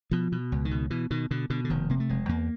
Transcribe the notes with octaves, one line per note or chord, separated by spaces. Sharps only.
B2 F3
B2
C#2
D#3
B2
B2 E3
B2 D#3
B2 D3
B2 D3
D3
F1 D#3
C3 A#3
A3
F1 G#3
E2 A#3